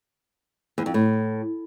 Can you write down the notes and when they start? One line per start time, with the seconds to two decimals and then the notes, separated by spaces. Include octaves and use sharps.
0.78 E2
0.86 F2
0.94 A2